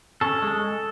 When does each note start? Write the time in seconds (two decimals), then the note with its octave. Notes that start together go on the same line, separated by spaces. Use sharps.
0.21 C#4 A4
0.42 G#3